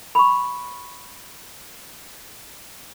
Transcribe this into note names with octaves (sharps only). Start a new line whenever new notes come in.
B5 C#6